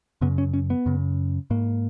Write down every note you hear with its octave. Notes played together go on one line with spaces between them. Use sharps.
F#2 C#3 B3
C#4
C#4
B3
F#2 C#3
G#2 A#3